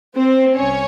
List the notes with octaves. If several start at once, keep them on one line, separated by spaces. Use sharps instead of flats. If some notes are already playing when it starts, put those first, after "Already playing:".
C4 C5
C2 C#4 C#5